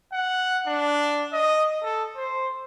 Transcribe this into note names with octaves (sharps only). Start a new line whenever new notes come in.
F#5
D4
D#5
A4
C5